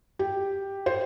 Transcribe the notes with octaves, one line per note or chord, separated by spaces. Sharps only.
G4
C5